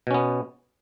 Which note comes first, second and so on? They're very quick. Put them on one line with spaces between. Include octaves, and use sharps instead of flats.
B2 C#4 B3